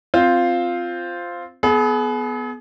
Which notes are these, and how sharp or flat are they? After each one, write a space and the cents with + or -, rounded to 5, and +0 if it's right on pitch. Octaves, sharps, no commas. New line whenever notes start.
C4 +0 F4 +0 C5 +0
B3 +0 G#4 +40